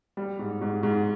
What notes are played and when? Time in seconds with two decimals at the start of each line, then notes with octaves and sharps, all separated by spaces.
0.17 G3
0.39 G#2
0.61 G#2
0.83 G#2